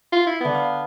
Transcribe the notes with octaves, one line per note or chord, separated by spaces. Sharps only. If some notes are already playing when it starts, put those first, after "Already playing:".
F4
E4
D3 B3 B5
F5 F6